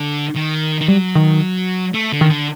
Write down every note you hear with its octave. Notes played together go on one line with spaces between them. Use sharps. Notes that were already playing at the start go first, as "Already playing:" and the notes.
Already playing: D3
D#3
D#3
F#3 G3
D#3
A3
D3
D#3
D3